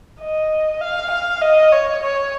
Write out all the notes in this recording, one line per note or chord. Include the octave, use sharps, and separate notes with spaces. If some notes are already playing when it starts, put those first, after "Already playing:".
D#5
F5
F5
D#5
C#5
C#5